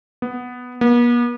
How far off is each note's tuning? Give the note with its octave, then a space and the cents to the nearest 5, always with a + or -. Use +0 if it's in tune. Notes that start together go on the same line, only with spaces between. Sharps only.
B3 +0
B3 -45